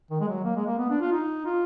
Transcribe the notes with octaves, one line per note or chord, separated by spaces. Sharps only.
D#3
G#3
F#3
A#3
G#3
A#3
B3
D4
F4
D#4
F4